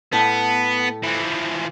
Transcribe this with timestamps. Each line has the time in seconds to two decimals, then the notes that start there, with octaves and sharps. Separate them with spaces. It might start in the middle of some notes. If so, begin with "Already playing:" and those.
0.13 A2 B3 A4
1.03 E3 F3